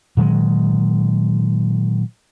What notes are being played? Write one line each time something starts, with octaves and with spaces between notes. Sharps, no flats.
A#2 D#3 F#3 G#3